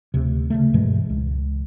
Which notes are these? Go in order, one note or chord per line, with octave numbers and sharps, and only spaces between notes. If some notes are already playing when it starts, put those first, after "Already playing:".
D2 C3
C#3 A3
G2 B2 E3 G#3
C#2